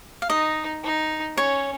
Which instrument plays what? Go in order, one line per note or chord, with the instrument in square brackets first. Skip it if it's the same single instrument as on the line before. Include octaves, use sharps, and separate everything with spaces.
[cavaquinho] F5
[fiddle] D#4 [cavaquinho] D#5
[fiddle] D#4
[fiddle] C#4 [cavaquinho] C#5